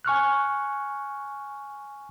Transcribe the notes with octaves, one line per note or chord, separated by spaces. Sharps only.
G#5 C#6 F6 F#6